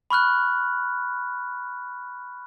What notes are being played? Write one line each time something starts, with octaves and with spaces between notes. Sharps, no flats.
B5 C#6 F6 F#6